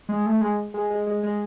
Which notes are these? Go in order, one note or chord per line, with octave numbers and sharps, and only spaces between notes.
G#3
A3
G#3
G#3
G#3
G#3
G#3